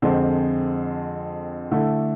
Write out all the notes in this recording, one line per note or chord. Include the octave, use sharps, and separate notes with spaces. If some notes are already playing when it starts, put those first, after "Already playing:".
F2 D3 G#3 C4
D3 A3 E4